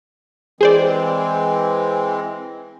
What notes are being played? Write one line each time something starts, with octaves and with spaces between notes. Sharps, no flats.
E3 G#3 C4 G#4 C5 D5